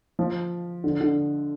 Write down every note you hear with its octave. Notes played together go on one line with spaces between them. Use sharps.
F3
D3
D3